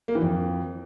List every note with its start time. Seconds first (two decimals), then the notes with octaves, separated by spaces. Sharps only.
0.08 A#3
0.15 E3
0.22 F2